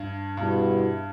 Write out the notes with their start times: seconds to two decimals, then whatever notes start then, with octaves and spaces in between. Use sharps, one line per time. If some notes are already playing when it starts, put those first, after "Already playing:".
Already playing: G2
0.37 G2 B2 G3 B3 E4